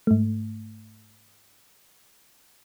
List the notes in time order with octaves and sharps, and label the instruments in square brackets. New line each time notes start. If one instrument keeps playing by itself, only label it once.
[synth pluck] G#2 A3